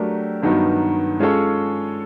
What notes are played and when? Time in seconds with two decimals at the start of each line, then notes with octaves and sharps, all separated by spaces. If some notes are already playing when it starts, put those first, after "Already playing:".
Already playing: F#3 A3 D4 G4 A#4
0.42 G2 D#3 F#3 B3 D#4
1.19 G#3 C#4 F4 A4 C#5